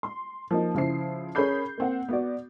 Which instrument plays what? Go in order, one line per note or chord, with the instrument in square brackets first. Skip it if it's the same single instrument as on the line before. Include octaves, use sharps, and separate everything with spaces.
[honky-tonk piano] C6
F3 A#3 D#4
C#3 F3 E4 C5 C7
C#4 G#4 A#4 B5 G6 C7
A#3 C4 F#5
B3 F#4 D5